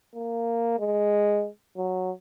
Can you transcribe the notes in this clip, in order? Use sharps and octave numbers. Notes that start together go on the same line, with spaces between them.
A#3
G#3
F#3